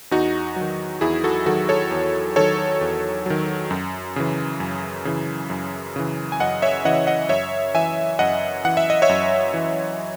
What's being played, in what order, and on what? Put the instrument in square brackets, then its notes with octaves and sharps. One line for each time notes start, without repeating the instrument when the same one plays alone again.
[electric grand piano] E2 D#4 F#4
D#3 F#3
E2 E4 G#4
F#4 A4
D#3 F#3 F#4 A4
A4 C#5
E2
D#3 F#3 A4 C#5
E2
D#3 F#3
F#2
C#3 E3
F#2
C#3 E3
F#2
C#3 E3
G#5
F#2 D#5 F#5
C#5 E5
C#3 E3 D#5 F#5
D#5 F#5
F#2 C#5 E5
E3 E5 G#5
F#2 D#5 F#5
E3 F#5
E5
D#5
C#5 E5
F#2
E3